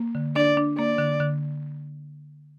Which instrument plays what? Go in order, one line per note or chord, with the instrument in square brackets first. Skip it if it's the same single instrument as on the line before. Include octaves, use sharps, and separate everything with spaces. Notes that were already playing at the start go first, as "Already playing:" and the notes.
Already playing: [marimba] A#3
D3
[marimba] D4 [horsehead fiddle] D5
[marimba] D4
[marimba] A#3 [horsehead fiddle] D5
[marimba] D3
D3